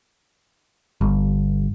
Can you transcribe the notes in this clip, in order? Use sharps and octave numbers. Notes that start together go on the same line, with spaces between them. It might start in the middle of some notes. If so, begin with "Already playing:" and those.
G1